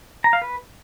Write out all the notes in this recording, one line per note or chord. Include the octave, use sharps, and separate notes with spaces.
A#5
F5
B4